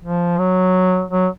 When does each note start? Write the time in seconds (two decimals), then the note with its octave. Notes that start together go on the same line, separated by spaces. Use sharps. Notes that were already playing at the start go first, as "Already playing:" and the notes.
0.03 F3
0.39 F#3
1.11 F#3